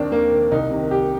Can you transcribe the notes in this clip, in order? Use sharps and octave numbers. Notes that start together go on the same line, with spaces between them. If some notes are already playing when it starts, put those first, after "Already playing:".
Already playing: D#2 D#3 C4 D4
D#2 A#3
D#3
C2 D#4
C3 D#3
C2 G4